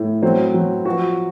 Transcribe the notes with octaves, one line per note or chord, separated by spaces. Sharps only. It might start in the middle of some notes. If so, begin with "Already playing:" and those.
Already playing: A2
F#3 C4
F#3
F3 F#4